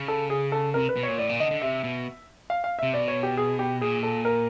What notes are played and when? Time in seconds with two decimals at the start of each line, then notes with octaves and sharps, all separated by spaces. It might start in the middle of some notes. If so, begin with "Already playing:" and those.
Already playing: C#3
0.08 A4
0.30 G#4
0.52 A4
0.74 C3 A#4
0.89 B4
0.97 B2
1.03 A#2 C#5
1.18 A2 D5
1.29 A#2
1.40 D3 D#5
1.51 D3
1.62 C3 E5
1.84 B2
2.50 F5
2.64 F5
2.79 C3 E5
2.94 B2 D5
3.08 C#5
3.23 G4
3.37 G#4
3.59 G4
3.81 A#2 G#4
4.03 A4
4.25 A#4